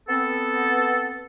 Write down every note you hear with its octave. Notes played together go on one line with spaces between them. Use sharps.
B3 C4 A4